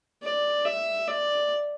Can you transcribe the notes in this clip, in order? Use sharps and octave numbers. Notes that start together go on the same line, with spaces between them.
D5
E5
D5